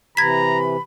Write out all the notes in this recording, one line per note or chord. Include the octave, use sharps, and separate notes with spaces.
C3 E3 A#5 B5 G#6 B6